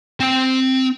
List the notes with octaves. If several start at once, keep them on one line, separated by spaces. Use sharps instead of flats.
C4 G5